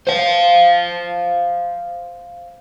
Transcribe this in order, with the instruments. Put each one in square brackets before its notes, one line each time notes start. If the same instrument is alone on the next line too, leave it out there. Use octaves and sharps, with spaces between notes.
[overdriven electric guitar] C5 F5